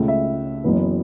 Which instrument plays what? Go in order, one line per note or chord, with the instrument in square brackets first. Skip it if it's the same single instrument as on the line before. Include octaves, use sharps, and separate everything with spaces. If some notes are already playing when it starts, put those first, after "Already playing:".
Already playing: [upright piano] C#2 C#3 A3
E5
F#1 F#2 E3 B3